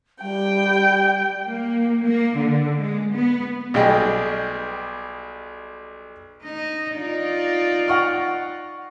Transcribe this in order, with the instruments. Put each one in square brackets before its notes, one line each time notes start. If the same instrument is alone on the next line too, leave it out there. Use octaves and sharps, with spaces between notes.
[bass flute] G3 [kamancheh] G5
[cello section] A#3
A#3
D3
G#3
B3
[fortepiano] B1 G3 G#4 D#5 G5
[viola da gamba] D#4 D#5
D#4 F4 D5
[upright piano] F#5 C#6 F6